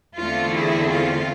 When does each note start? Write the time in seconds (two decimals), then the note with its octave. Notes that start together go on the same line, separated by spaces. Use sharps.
0.16 E2 D3 A3 C4 F4
0.53 E4 G#4
0.90 F4